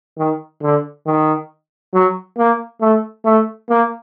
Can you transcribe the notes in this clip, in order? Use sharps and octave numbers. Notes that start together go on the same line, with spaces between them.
D#3
D3
D#3
F#3
A#3
A3
A3
A#3